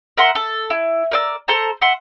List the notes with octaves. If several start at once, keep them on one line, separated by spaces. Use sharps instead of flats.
A#4 E5 F#5 C6
A4
E4
A#4 D5 E6
A4 C5 A5 A#5
E5 F#5 C6